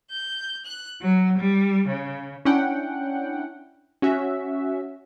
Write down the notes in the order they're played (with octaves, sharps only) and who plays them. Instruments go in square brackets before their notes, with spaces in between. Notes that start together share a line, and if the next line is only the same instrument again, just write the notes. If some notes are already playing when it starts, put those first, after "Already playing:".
[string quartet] G6
F#6
F#3
G3
C#3
[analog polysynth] C#4 D4 E4 F#5 G5
C#4 F#4 E5